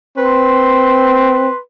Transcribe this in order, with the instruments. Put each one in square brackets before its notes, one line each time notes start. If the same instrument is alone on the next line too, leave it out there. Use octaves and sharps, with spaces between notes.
[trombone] C4 [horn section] B4 C6